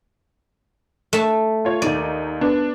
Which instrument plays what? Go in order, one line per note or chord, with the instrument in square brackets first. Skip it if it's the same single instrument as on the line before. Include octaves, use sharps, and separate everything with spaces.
[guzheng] A3 A5
[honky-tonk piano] F4 C#5
[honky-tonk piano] D#2 D#4 D#7 [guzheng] D5
[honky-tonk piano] B3 D4